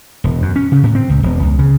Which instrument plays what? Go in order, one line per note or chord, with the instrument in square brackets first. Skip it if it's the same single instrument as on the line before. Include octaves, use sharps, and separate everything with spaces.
[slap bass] E1
F#2
C#4
C#3
A2
C4
C#2
E1
C#2
C#3